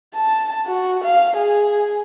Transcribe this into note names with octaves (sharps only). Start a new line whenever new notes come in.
A5
F#4
F5
G#4